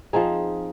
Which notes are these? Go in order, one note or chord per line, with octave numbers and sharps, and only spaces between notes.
F3 C4 D#4 G#4